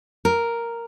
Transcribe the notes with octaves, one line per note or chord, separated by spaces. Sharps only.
A#4